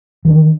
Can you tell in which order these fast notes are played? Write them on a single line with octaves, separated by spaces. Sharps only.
E3 D#3 D4